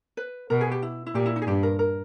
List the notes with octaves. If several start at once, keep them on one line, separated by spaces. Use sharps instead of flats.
B4
B2 A#4
G#4
G4
E4
E4
A#2 G4
E4
D#4
G#4
G2 G4
A#4
A#4